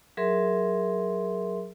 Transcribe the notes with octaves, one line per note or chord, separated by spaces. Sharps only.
F#3 G#4 A#4 E5 C6